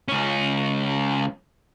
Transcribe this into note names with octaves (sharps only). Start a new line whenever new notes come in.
C#2 C#4